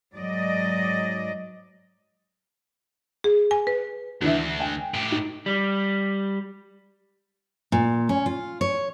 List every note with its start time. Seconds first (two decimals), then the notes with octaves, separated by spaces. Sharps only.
0.15 G#2 F#3 D5 D#5
3.24 G#4
3.51 G#5
3.67 B4
4.22 D2 D3 E3 E5
4.59 G5 G#5
4.94 A2 G4
5.12 D#4
5.46 G3
7.72 A#2
8.09 C#4
8.26 F4
8.61 C#5